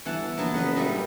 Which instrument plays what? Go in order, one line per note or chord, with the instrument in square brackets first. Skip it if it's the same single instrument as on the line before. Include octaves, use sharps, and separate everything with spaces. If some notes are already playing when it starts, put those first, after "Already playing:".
[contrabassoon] G1 [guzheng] E3 F#5 A5
[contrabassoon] A#1 [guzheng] F#3 B3 A5
[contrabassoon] F#1 [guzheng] B4 D#5 F#5
[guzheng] A#2 G3 A3
[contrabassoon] G2